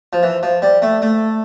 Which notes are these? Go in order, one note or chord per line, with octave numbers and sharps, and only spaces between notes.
F3
E3
F3
G3
A3
A3